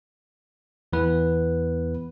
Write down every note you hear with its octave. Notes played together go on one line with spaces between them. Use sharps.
E2 E3 B3 B4